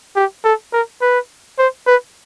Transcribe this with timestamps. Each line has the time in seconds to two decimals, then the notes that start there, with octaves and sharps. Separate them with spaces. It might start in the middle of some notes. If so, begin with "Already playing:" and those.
0.16 G4
0.44 A4
0.73 A#4
1.01 B4
1.58 C5
1.87 B4